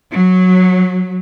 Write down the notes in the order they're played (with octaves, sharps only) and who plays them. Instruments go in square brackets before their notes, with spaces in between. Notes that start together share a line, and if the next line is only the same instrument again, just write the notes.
[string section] F#3